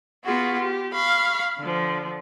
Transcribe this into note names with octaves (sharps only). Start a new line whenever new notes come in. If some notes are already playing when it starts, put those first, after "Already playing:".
B3 F4 F#4 G#4
G4
F5 B5 C#6
D3 F3